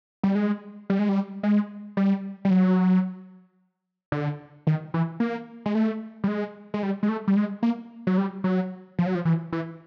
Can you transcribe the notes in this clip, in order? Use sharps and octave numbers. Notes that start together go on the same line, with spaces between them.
G3
G#3
G3
G#3
G3
G#3
G3
G3
F#3
D3
D#3
E3
A#3
G#3
A3
G3
G#3
G#3
G3
G#3
A3
G3
G#3
A#3
F#3
G3
F#3
F3
F#3
F3
E3
E3